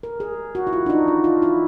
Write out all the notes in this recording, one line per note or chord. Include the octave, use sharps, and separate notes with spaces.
A#4
G#4
F#4
E4
F4
D4
D#4
F4
F4
E4